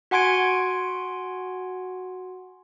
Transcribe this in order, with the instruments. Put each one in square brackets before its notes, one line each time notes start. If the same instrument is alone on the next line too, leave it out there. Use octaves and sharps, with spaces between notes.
[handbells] F#4 F#5 G#5 C6 G#6 D7